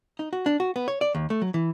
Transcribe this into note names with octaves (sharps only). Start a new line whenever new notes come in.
D#4
F#4
D4
F#4
B3
C#5
D5
D#2
A3
F#3
E3